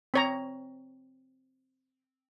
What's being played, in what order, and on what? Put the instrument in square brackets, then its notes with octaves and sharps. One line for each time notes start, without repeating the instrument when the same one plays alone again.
[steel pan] C4 C#5 A#5